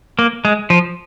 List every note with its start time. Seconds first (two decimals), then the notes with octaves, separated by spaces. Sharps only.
0.19 A#3
0.45 G#3
0.70 F3